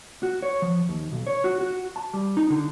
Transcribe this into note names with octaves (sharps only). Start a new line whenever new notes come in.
F#4
C#5
F3
D#2
B1
C#5
F#4
F#4
A5
G3
D#4
D3